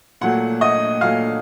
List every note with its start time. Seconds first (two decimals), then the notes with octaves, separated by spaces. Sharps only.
0.21 A#2 F#3 A3 F#5
0.61 D#5 D#6
1.01 A#2 F#3 A3 F5 F6